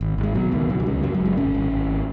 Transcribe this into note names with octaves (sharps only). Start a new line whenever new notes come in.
G#1
G#1
G#3
B2 F#3
C#2 D#3
C#2 F#3
F#3
C#3 G#3
F#2 F#3
F#3
F#1 G#3
G#1 C#4
G#1
G#1